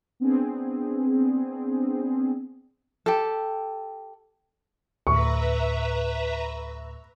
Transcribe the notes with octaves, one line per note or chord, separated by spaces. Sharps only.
B3 C4 D4 G#4
G4 A4
D2 A2 B4 E5 A#5 C#6